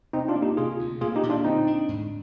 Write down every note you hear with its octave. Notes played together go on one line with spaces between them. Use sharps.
C3 C4 D#4
D4 F4
A#3
D#4 G4
C3 F4 G#4
D2
A#2 F4 G#4
D#4 G4
A#2
D4 F4
D3 C4 D#4
D4
G#2